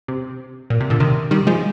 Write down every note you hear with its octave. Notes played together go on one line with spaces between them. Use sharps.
C3
A#2
C3
A#2 D3
C3 D#3
D#3 G3
F3 G#3